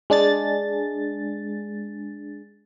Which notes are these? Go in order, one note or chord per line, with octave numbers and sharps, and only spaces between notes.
G#3 D4 G#4 A6